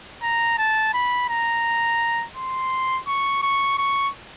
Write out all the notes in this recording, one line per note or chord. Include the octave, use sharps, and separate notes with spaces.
A#5
A5
B5
A#5
C6
C#6
C#6
C#6